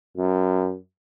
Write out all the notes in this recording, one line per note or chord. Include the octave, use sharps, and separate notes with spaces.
F#2